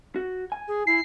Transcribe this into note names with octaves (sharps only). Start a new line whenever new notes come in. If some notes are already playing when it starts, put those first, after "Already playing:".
F#4
G#5
G#4
E4 C7